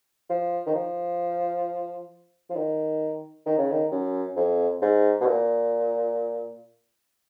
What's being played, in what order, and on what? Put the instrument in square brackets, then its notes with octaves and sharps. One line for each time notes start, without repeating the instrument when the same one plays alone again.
[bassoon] F3
D#3
F3
F3
D#3
D#3
C#3
D#3
F#2
F2
G#2
B2
A#2